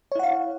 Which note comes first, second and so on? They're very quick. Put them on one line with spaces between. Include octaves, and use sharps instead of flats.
C#5 E4 F#5 F5